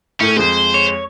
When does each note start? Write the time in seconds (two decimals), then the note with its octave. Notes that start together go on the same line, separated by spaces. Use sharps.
0.20 A2 A3 C#4
0.37 F2 G#3 C5
0.74 C#5